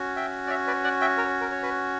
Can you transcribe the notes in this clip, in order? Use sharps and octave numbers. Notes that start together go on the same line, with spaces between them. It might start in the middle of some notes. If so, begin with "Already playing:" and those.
Already playing: C#4 F#4
E5 G5
D5
C#5 E5
B4 D5
D5 F#5
E5 G5
A#4 C#5
A#4
C#5
B4